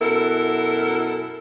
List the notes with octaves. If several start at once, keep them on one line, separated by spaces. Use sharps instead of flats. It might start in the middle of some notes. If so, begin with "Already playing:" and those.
F#2 B2 E4 A4 A#4